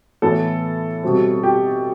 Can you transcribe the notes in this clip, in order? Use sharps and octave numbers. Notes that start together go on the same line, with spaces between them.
A2 E3 B3 A4
B2 G3 C4
G4